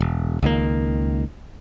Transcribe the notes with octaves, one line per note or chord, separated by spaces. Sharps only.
E1
C#2 D#3 A#3